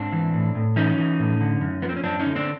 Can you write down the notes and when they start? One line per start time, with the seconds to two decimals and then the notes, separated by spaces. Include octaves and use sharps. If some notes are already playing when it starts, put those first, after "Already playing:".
Already playing: G#2 C4 D4
0.12 E3
0.34 A2
0.55 A2
0.76 E3 C#4 D#4
0.98 E3
1.19 A2
1.40 D3
1.61 F#2
1.82 F3 B3
1.89 C4
1.97 C#4
2.04 F#2 C4 D4
2.19 C#4 D#4
2.26 D3
2.35 C4 D4